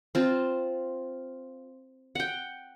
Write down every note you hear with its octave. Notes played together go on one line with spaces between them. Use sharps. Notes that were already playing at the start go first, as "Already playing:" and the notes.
C4 F4 A5
F#5 G5